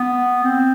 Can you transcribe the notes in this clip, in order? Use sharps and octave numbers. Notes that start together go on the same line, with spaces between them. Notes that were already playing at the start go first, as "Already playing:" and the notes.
Already playing: B3
C4